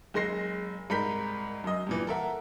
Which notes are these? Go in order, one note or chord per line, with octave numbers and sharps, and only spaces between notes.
F#1 G#3 C6 A#6 C7
C2 G#2 A#4 B5 G6 B6
F#2 D#5
G2 A#2 E3
A4 A#4 E5 F#5